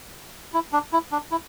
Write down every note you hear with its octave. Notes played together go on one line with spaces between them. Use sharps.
E4
D4
E4
D4
E4